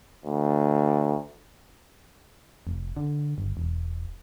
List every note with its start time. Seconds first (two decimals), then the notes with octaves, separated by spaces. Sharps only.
0.25 D2
2.67 F1
2.97 D3
3.38 G1
3.57 E1